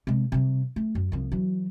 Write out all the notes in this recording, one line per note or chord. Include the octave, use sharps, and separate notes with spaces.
C3 G#3
C3 G3
A3
F#2
C2 F3
E3 F#3